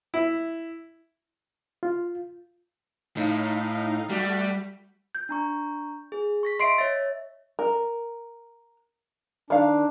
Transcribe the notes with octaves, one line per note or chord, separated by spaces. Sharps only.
E4
F4
A2 D#4 F5
G3 A3 F#4 G4
G6
D4 A#5 C#6
G#4
C#6 A#6 B6
D#5 E5 C6 C7 D7
C#5 E5 A6
A#4
D#3 D4 F5